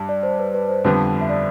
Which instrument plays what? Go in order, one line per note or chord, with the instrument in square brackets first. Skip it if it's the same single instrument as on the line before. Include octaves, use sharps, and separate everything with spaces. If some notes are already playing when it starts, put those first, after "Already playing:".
Already playing: [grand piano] G2
[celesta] D5
C5
B4
B4
C5
[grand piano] F2 D3 G3 B3
[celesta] E5
D5